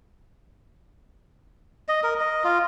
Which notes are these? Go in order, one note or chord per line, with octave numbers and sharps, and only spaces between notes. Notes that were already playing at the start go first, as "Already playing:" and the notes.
D#5
A#4
D#5
F4